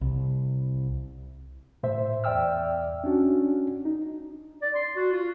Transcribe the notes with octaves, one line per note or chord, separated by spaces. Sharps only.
C2
A2 C5 E5
E2 D5 E5 G5 E6 F6
C#4 D4 F#4
D#4
D5
C6
F#4
F4